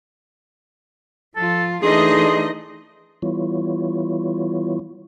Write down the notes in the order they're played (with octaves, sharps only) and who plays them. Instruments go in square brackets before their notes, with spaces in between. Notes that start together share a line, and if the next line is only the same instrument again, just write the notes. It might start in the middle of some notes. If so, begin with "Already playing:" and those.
[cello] F3 F4 [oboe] A4
[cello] E3 D4 [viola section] A3 D#4 D#5 [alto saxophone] G#4 [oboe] C6
[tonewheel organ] E3 G3 B3 E4 F4 C#5